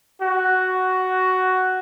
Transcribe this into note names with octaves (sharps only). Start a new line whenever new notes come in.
F#4